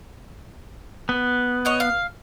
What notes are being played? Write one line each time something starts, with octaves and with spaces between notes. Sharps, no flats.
B3
C#5 D#5 F#5
F5